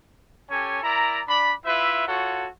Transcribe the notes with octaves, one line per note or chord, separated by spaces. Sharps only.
C#4 G4 A4 C#5 G#5
E4 A#4 D5 A#5
D4 D5 B5
E4 F4 B4 E5
F4 F#4 A4 C#5 F#5